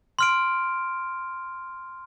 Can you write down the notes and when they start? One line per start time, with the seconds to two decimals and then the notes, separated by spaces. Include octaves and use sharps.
0.19 C6 F6 D7